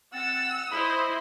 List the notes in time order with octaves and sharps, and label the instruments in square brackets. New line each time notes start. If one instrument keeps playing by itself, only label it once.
[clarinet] C4 [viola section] F#5 [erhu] E6 [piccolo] A6
[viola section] E4 C5 D#5 [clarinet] B5 [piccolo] D#6